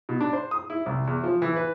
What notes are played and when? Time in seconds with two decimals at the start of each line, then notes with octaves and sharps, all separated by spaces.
0.09 B2
0.21 D4
0.33 C5
0.51 D#6
0.70 E4
0.86 C2
1.07 E2
1.24 F3
1.42 E3
1.56 B4